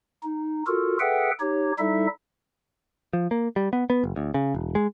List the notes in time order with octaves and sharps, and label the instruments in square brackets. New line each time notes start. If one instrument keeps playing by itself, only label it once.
[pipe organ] D#4
F4 F#4 A4 A#4
G#4 A4 B4 E5 F#5 G5
D#4 G4 C#5
G3 D#4 E4 A4 E5
[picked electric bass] F3
A#3
G3
B3
B3
F#1
D2
C#3
E1
G#3